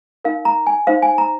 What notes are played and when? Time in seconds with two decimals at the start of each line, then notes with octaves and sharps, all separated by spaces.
0.25 D#4 A#4 F5
0.45 A#5
0.67 G#5
0.87 D#4 C5 F5
1.03 G#5
1.18 A#5